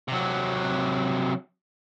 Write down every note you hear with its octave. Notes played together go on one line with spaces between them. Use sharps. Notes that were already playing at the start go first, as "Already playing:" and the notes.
C3 F#3